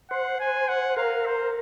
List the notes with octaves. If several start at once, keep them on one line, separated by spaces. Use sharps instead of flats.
C5 F#5
G#5
F#5
A#4 F5
C5